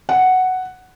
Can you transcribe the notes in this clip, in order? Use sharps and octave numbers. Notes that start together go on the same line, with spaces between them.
F#5